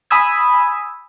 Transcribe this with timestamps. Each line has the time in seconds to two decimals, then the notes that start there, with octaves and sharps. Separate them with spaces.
0.10 G#5 B5 D#6 E6 G#6